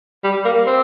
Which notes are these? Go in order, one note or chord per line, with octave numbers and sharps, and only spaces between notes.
G3
A#3
C4